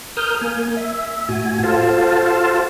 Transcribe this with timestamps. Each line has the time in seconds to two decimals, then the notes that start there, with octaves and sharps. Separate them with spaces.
0.17 A#4 D#6 F6 G6
0.41 A#3 G#5
0.77 E5
1.29 A2 F#4 G#5
1.63 F4 F#4 A4 C5 F5 A5